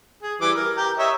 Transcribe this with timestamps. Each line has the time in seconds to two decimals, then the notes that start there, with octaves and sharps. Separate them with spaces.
0.23 G#4
0.41 E3 G3 D6
0.55 A#4
0.77 G4 A#5
0.98 C#5 D#5 E5